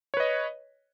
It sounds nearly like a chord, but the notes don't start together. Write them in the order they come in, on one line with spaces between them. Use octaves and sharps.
C#5 B4 D#5